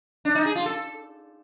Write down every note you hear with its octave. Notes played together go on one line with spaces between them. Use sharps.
D4
D#4
G#4
F4
A4